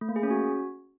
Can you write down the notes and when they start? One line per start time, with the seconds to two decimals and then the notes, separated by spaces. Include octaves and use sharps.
0.01 A3
0.09 A#3
0.16 G#4
0.23 C#4
0.31 F#4